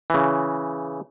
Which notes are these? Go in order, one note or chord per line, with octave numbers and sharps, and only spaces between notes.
C#3 E3